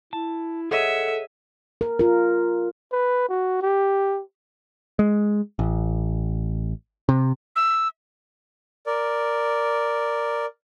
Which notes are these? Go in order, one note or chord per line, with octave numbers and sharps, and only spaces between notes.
E4 A5
G#4 A4 C#5 D#5 E5 F#5
A#4
F4 A#4
B4
F#4
G4
G#3
A1
C3
E6
A#4 D5